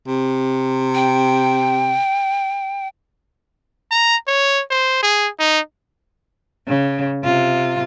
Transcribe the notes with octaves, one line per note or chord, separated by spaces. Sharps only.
C3
G5
A#5
C#5
C5
G#4
D#4
C#3
C3 F4